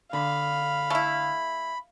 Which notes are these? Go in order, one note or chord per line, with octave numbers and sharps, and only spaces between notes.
D3 F5 B5
A3 E4